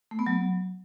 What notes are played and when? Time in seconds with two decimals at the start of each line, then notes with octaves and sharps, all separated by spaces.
0.11 A3
0.19 B3
0.26 F#3